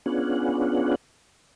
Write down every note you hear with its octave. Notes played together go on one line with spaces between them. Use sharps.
B3 C#4 D4 F4 G#4 F#5